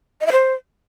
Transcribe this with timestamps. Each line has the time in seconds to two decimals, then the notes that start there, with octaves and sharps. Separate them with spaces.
0.21 D#5
0.26 E5
0.32 C5